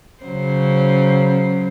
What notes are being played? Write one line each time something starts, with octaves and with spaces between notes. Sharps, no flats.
C#3 F#3 C5